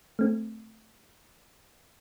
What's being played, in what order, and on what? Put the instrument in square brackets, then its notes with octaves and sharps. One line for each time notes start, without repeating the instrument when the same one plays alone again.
[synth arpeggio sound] A3 C4